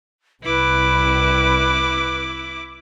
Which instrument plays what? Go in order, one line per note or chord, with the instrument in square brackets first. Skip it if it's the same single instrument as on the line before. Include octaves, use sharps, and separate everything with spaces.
[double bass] C2 C3 [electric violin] E4 D6 [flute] B4